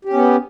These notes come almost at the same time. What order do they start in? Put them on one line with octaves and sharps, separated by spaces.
G4 C#4 B3